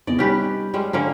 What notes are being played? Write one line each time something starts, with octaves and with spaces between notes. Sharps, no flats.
E2 C3 B3 D5 D#5
G3 C#4 D#4 G4 B4
G3 G#3 C#4
D3 A#3 C#4 F4